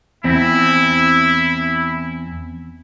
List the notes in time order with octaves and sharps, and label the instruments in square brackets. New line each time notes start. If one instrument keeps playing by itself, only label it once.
[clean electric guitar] E2 C4 [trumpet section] E4